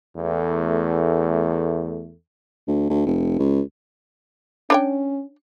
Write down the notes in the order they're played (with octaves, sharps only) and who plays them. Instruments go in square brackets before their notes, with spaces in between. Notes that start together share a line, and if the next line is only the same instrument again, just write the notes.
[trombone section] E2 A3
[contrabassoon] D2
D2
F1
C#2
[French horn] C#4 [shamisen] D4 C#5 G5